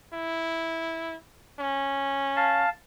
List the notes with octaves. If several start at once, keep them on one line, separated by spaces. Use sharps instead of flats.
E4
C#4
F5 A5